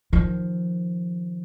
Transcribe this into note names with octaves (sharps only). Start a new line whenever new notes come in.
D#3 F3